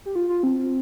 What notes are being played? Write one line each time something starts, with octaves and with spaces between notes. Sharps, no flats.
G4
F4
F4
C4